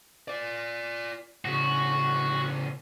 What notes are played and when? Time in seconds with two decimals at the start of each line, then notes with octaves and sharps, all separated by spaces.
0.28 F4 D5
1.45 A2 C#3 F#4